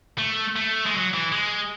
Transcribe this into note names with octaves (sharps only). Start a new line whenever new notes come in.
A3
A3
G#3
F#3
E3
G#3